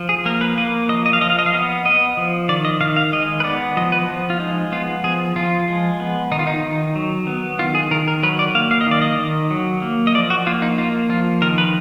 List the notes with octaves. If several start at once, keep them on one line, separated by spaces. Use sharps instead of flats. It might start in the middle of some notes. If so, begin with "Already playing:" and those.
Already playing: F3
G#4
A#3 A#4
B4
A#3 B4
F3 D#5
D#5
F5
F3 D#5
F5
D#5
F5
B3 D#5
B3 D#5
F3
D#3 D5
D#5
D#3 F5
F5
G#3 D#5
B4
B3 D5
F3 D#5
B4
F3
F4
G#3 D#4
B3 F4
F3 G#4
F3 F4
G#3
B3
D#3 D#4
F4
D#4
D#3
F#3
B3
D#3 F4
G#4
D#3 A#4
A#4
F#3 B4
D5
A#3 F5
F5
D#5
D#3 D5
D#5
D#3
F#3
A#3
D#5
F3 D5
F#4
A#3 F4
D#4
A#3 F4
F3 F4
D#3 A#4
B4